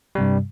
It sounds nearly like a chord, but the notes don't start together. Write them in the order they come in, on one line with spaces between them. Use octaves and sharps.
G3 C3 G2